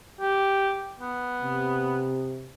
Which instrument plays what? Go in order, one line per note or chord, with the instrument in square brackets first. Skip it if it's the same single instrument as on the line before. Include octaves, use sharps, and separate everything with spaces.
[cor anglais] G4
B3
[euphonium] C3